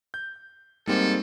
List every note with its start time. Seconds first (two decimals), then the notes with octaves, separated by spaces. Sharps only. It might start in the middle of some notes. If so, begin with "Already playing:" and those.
0.14 G6
0.87 G#2 G3 A#3 C4 A4